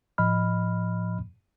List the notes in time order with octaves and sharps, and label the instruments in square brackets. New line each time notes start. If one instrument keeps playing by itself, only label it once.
[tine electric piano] A2 F3 D#5 B5 F6